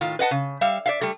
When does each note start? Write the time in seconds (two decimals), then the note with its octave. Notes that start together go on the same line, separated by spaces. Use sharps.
0.01 A2 D#3 F4
0.19 B4 D#5 F#5 A5
0.31 C#3
0.61 G3 E5 F5
0.86 D5 E5 F5
1.01 G3 A3